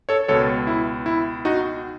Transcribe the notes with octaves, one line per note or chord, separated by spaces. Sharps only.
A4 C#5
C#2 B2 A4 C#5
E4
E4
D#4 F#4